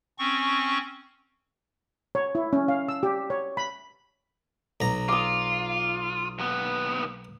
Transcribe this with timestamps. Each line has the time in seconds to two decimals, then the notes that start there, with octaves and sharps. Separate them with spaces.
0.19 C4 C#4 C#6
2.15 C#5
2.35 E4
2.53 C#4
2.68 F5
2.88 E6
3.03 G4
3.30 C#5
3.57 B5
4.81 B1 A#5
5.08 F4 D6 D#6
6.39 D#2 B3